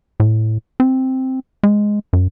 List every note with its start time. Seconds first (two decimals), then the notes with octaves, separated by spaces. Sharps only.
0.20 A2
0.80 C4
1.63 G#3
2.13 F#2